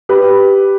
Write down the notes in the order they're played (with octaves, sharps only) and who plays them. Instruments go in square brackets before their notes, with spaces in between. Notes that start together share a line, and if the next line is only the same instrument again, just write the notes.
[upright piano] G4 B4